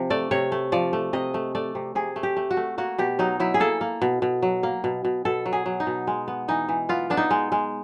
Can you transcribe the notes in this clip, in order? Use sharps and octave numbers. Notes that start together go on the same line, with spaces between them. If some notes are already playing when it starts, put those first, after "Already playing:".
Already playing: C3 F3
A3 D5
C3 C#5
A3
F3 D5
A3
C3 D#5
A3
A3 D5
C3
C3 G#4
A3
G4
A3
F#4
A3
A#3 F#4
B2 G4
F#3 D#4
F#3 E4
G#4
A#3 A4
A#3
B2
B2
F#3
A#3
B2
B2
B2 A4
F#3
G#4
F#3
D#4
B2
G#3
B3
E3 D#4
E3
B3 F4
B3 D4
D#4
G#3
G#3